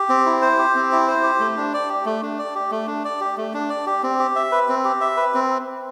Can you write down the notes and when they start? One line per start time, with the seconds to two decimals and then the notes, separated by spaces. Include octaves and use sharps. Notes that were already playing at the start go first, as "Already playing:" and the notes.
Already playing: G4
0.09 C4
0.26 E4
0.42 C5
0.58 G4
0.75 C4
0.92 E4
1.08 C5
1.23 G4
1.40 A3
1.57 D4
1.74 D5
1.89 G4
2.05 A3
2.23 D4
2.38 D5
2.55 G4
2.71 A3
2.87 D4
3.05 D5
3.20 G4
3.37 A3
3.54 D4
3.70 D5
3.86 G4
4.03 C4
4.19 G4
4.36 E5
4.52 B4
4.69 C4
4.85 G4
5.01 E5
5.17 B4
5.34 C4